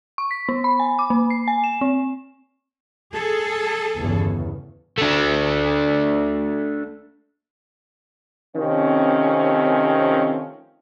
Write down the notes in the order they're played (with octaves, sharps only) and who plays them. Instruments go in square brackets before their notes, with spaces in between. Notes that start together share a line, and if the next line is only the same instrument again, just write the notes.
[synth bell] C#6
B6
B3
B5
G#5
D6
A#3
C7
G#5
E7
C4
[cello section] G#4 A4
[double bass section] G1 E2 C#3
[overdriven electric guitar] A3 D4
[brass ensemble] C3 D#3 F3 A3 C4 C#4